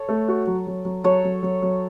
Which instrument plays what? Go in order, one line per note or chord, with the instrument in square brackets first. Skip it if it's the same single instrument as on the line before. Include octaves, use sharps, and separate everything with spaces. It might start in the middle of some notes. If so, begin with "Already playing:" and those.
Already playing: [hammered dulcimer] A4 C#5
[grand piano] A3
F#4
F#3
F#3
F#3
[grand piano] F#3 [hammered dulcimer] A4 C#5
[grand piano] F#3
F#3
F#3